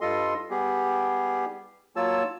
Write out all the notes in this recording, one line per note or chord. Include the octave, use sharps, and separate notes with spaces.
G2 G3 F4 A4 D#5 C6
G3 B3 G4 G#4
F#3 A#3 F4 C#5 A5 E6